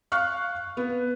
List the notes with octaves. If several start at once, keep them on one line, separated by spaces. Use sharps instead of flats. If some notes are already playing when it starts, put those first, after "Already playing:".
F5 C#6 F6 F#6
B3